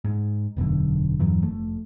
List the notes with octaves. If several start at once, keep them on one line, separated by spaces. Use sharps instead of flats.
G#2
E1 B1 F#2 D3
E2 G2 E3 F#3
F1 A3